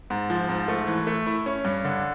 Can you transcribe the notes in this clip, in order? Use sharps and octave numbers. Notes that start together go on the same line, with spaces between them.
G#2
F3
G#2
A3
E3
A3
E4
C#4
G2
D3